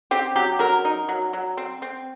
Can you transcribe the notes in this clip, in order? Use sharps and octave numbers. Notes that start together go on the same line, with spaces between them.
C4 G4
F#3 G4
F#3 A#4
D#4
F#3
F#3
C4
C4